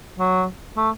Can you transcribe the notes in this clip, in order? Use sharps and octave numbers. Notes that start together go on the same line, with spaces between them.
F#3
A3